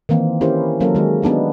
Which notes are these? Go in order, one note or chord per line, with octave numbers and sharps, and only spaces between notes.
D#3 E3 A#3 C4
C#4 E4 G4 A#4 C5
F#3 A#3 C#4 A4 A#4
D#3 G#3
B3 D4 D#4 F#4